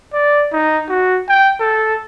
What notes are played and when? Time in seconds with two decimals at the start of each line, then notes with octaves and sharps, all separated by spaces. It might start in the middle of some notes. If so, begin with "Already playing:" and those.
0.13 D5
0.53 D#4
0.89 F#4
1.29 G5
1.60 A4